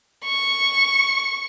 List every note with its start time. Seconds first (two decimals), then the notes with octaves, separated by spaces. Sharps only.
0.25 C#6